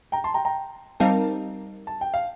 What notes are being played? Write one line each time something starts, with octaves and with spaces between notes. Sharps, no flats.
G5 A#5
A5 C6
G5 A#5
G5 A#5
G3 C4 D#4 A#4 F5 A5
A5
G5
F5